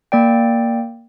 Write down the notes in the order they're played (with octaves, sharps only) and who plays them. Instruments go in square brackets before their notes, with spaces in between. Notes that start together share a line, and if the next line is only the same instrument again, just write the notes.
[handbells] A#3 D5 G5